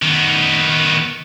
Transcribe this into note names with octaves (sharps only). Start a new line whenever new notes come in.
D#3 B3